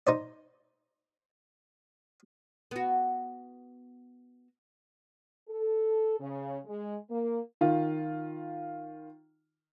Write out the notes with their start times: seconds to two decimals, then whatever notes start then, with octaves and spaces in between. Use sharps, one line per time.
0.07 D#4 C5 D5
2.71 B3 F#4
5.48 A4
6.20 C#3
6.65 G#3
7.10 A#3
7.61 D#3 F4